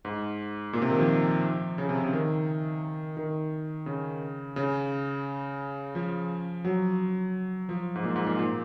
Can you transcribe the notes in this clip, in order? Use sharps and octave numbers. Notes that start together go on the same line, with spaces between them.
G#2
A#2
C3
D#3
F3
C#3
C3
C#3
D#3
D#3
C#3
C#3
F3
F#3
F3
G#2
A#2
G#2
A#2
A#2